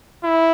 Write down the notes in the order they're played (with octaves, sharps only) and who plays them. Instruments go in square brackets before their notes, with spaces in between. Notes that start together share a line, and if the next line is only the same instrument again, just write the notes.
[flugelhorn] E4